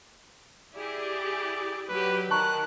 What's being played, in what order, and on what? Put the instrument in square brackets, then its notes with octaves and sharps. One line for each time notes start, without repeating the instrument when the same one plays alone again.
[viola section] E4 G4 G#4 [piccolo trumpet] D5
[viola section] F#3 G4 [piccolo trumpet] B4
[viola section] D#3 [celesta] A5 A#5 C#6 [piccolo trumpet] F#6